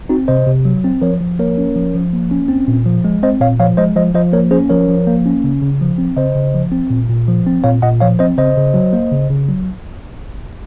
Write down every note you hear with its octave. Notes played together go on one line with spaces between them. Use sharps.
C4 D#4 F#4
C3 C5 D#5
C3
F#3
C4
F3 A#4 C#5
F3
A#3 A#4 C#5
C#4
F3
F3
A#3
C#4
C4
A#2
F3
G#3
C4 C5 D#5
A#2 C#5 F5
F3 C#5 F5
G#3 C5 D#5
F3 C5 D#5
F3 C5 D#5
A#3 A#4 C#5
C#4 G#4 C5
F3 A#4 C#5
F3
A#3
C#4
C#3
C#3
F3
C4
C#3 C5 D#5
C#3
F3
C4
A#2
A#2
F3
C4
A#2 C#5 F5
A#2 D#5 F#5
F3 C#5 F5
C4 C5 D#5
C#3 C5 D#5
C#3
F#3
A#3
C#3
C#3
F#3